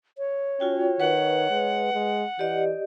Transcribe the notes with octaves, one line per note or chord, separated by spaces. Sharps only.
C#5
C#4 F4 F#4 G5
D#3 B4 F#5
G#3
G#3
E3 G4 D5 D#5